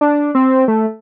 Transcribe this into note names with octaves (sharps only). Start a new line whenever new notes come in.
D4
C4
A3